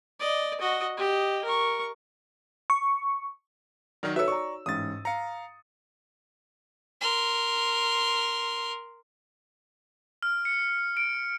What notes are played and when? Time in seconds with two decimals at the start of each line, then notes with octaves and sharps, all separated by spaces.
0.20 D5 D#5
0.60 F#4 D#5
0.97 G4 D#5
1.44 A#4 C#6
2.70 C#6
4.03 D#3 F#3 D#4 A#4 D5 F6
4.16 F#4 A4 B4 C#5 E5 E6
4.28 D5 A#5 C#6
4.66 A1 G#2 D#6 A6
5.05 F5 A#5 C#7
7.01 A#4 C6
10.23 F6
10.45 C#7
10.97 D7